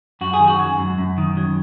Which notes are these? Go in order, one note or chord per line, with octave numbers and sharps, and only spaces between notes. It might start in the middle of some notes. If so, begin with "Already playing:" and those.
F#2 F#4
G#4
D#3
F#4
F#3
F#2
F#2
D#3
F#3